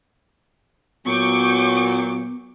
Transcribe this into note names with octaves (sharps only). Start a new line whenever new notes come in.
A#2 F#3 B3 C#6 D6 G6